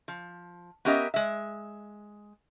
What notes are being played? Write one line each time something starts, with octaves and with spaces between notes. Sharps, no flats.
F3
B3 C#4 G4 A#4 D#5 E5
G#3 E5